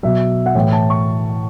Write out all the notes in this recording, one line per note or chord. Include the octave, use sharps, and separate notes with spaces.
B2 F#3 E5
F#5
A2 E3 G5
A5
C#6